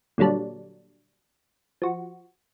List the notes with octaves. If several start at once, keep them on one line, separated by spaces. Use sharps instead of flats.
A#2 D3 F#3 G3 D4
F3 F#4